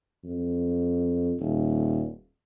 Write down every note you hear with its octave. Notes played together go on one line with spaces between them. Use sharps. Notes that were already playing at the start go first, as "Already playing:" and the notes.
F2
D#1